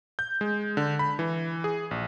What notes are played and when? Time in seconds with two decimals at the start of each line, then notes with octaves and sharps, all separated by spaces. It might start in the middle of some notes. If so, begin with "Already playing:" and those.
0.19 G6
0.41 G#3
0.77 D3
0.99 B5
1.19 E3
1.64 G#4
1.91 A#1